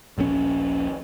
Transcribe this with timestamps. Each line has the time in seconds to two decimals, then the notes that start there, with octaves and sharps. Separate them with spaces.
0.18 D#1 A#1 G#2 C#4